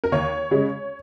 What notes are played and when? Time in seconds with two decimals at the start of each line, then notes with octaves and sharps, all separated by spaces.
0.04 A#4
0.12 D#2 C#5
0.51 C#3 G#3